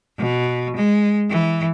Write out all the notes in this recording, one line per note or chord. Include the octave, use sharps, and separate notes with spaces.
B2
G#3
E3